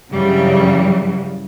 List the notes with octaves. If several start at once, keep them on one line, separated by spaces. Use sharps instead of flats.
G2 C#3 E3 F#3 G3